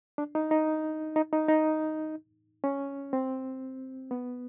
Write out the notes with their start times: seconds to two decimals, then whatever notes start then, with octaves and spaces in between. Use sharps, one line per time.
0.18 D4
0.35 D#4
0.51 D#4
1.16 D#4
1.33 D#4
1.48 D#4
2.64 C#4
3.13 C4
4.11 B3